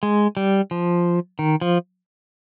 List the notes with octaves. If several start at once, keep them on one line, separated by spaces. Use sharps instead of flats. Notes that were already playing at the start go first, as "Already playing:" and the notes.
G#3
G3
F3
D#3
F3